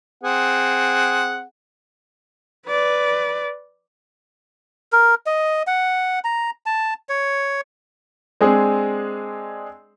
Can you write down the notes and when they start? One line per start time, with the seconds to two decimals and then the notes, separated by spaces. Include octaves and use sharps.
0.24 C4 G#4 F#5
2.67 B4 D5
4.92 A#4
5.26 D#5
5.67 F#5
6.24 A#5
6.66 A5
7.09 C#5
8.41 G#3 C4 D4 G#4